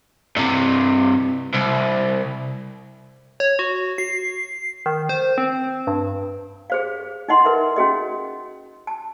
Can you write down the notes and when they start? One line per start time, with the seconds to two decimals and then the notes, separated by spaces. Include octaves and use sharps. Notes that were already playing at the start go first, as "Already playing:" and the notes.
0.37 G2 C3
1.54 C2
3.40 C#5
3.59 F#4
3.98 C7
4.86 D#3
5.09 C5
5.38 C4
5.87 G2
6.70 G#4 C5 F5
7.28 D#4 E4 D#5 F#5 C6
7.45 A#4 B4 E5
7.76 C#4 F#4 G#4 D#5
8.87 A5